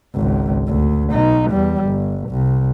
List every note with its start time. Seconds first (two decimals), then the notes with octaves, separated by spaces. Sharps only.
0.15 G#1 C#2
0.67 D2
1.10 B1 D#4
1.51 E2 G3
1.85 G1
2.29 C2